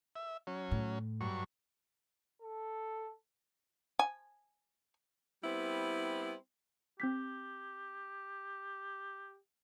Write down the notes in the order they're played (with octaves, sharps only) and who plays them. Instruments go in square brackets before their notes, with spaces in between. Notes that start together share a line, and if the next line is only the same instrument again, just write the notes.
[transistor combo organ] E5
F#3 C#4
[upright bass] A2
[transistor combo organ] G2 F#3 C#6
[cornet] A4
[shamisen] G#5
[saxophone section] G3 B3 C4 E4
[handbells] C4 G6 B6 [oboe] G4